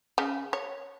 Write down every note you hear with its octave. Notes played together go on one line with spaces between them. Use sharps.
C#3
C#5